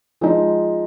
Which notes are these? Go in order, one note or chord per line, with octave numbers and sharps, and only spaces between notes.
F3 G#3 D#4